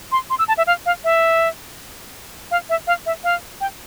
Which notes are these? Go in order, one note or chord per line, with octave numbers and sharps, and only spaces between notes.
C6
C6
E6
A5
E5
F5
F5
E5
F5
E5
F5
E5
F5
G5